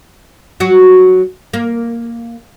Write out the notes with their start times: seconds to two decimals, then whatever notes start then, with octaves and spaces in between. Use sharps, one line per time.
0.60 F#3 F#4
1.54 A#3